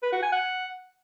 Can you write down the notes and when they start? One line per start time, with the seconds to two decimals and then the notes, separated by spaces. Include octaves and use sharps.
0.03 B4
0.12 F#4
0.22 G#5
0.32 F#5